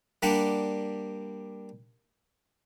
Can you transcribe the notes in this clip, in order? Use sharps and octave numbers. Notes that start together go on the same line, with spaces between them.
G3 A#3 D4 G4 F#5